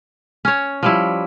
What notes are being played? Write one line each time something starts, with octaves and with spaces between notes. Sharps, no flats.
C#4 C#5
F3 G3 E4